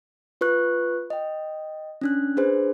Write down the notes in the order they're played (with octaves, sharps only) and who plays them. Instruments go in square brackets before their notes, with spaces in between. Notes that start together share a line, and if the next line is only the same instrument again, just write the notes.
[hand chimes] F4 B4 C#6 F#6
D#5 G5
C#4 D4 F#6
D4 G#4 B4 C5